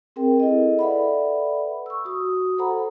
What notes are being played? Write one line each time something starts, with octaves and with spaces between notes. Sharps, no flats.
C4 G#4 A#4 G5
E4 G#4 A4 D#5
A4 B4 D5 E5 F#5 B5
C#6 E6
F#4 D#6
A4 C5 F#5 A#5 B5